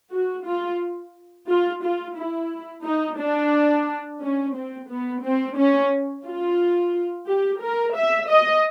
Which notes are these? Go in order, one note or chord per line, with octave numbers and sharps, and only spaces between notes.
F#4
F4
F4
F4
E4
D#4
D4
C#4
C4
B3
C4
C#4
F4
G4
A#4
E5
D#5